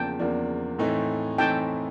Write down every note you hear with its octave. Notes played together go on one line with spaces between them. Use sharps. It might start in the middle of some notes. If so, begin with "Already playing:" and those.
Already playing: E2 C#3 F3 A#3 D4 G5 A5
E2 C#3 F3 A#3 D4
A2 E3 A3 C4 D#4
A2 E3 A3 C4 D#4 G5 A5